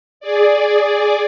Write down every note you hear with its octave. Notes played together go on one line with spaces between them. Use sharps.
G#4 D5